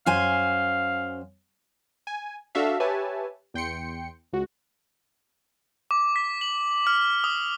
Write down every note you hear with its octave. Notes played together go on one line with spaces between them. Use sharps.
F#2 C5 F5 G#5
G#5
D4 F#4 A4 E5 F5
G4 B4 C#5 E5 G#5 A5
E2 G5 C6 C#7
C#2 F#4
D6
B6
F#7
F6
D#6